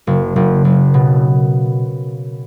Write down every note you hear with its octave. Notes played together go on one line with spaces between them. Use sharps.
F#1
F#1
F#1
B2